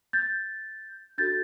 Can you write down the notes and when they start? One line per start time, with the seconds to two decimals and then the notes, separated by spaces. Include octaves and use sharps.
0.13 G6 A6
1.18 D4 F#4 A4 G6 A6